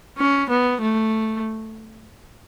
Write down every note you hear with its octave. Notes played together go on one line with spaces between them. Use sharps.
C#4
B3
A3